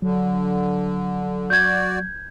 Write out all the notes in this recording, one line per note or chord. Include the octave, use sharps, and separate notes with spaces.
D3 F#3
F#4 D5 G6 G#6